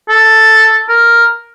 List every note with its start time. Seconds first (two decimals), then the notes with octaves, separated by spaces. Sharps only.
0.09 A4
0.89 A#4